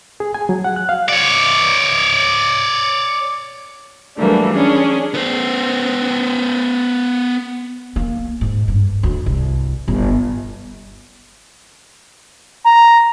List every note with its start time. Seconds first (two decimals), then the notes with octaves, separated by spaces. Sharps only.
0.20 G#4
0.34 G#5
0.49 F#3
0.64 F#5
0.76 F#6
0.89 F5
1.09 C#5 D5
4.18 E3 F#3 G3 A3 A#3 D4
4.52 C#4 D4 G#4
5.14 B3 C5
7.96 A#3
8.41 G#2
8.68 G2
9.03 D2
9.26 C2
9.88 G1
12.64 A#5